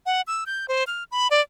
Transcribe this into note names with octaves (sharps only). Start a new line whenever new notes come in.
F#5
E6
G6
C5
F6
B5
D5